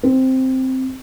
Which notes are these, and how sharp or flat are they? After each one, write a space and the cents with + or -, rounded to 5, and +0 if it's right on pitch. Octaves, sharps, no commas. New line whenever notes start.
C4 +0